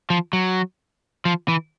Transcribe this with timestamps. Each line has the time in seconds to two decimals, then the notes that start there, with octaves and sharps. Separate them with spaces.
0.10 F3
0.33 F#3
1.25 F3
1.48 E3